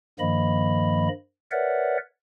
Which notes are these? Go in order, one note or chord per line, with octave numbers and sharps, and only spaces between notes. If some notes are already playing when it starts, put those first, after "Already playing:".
G2 D#3 F3 A#3 D#5 B5
A#4 B4 C#5 D5 E5 F#5